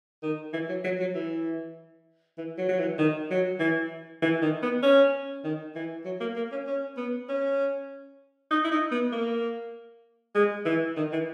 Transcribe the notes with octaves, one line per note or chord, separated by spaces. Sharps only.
D#3
E3
F#3
F#3
F#3
E3
E3
F#3
F#3
E3
D#3
F#3
E3
E3
D#3
B3
C#4
D#3
E3
F#3
A#3
A#3
C#4
C#4
B3
C#4
D#4
E4
D#4
B3
A#3
G#3
E3
D#3
E3